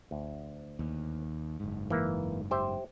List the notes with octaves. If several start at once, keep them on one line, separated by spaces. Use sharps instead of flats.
D2
D#2
F#1 G#2
E3 A#3
G4 C5 E5